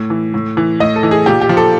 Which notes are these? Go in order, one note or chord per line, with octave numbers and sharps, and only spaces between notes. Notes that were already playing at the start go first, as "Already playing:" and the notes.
Already playing: A2
E3
A2
E3
A2 D#5
A4
E3
G#4
A#2 G4
G4
F3
A4